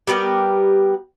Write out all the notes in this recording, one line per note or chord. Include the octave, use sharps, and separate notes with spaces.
G3 B3 G4 A#4